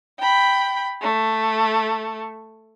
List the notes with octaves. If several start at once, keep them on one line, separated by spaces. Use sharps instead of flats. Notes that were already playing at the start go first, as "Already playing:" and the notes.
G5 B5
A3